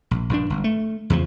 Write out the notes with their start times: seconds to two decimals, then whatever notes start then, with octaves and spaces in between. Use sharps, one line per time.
0.11 A#1
0.29 A#1 G2 D4
0.50 G1
0.64 A3
1.10 E2 C#3 F3